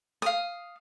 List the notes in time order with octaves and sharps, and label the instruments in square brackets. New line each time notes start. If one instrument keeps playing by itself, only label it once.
[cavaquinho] F5 D#6